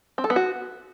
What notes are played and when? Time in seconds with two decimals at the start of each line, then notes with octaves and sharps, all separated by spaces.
0.18 C4
0.24 A4
0.30 B3
0.36 F#4